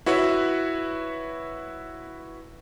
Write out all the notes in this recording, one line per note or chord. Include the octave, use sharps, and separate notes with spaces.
E4 F#4 B4 C#5 E5